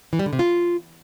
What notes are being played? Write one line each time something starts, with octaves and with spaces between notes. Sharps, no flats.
E3
G3
D3
C3
F4